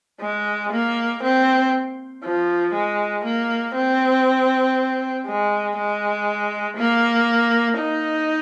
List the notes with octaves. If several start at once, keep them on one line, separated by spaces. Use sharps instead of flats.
G#3
A#3
C4
F3
G#3
A#3
C4
G#3
G#3
A#3
D#4